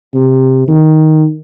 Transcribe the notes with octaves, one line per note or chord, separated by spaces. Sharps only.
C3
D#3